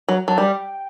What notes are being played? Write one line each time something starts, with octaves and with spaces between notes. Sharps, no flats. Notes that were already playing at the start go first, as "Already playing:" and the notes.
F#3
F#3 A5
G3 G5